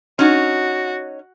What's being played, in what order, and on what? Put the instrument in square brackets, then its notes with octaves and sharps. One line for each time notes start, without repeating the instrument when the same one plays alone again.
[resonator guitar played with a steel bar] C#4 D#4 [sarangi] F#4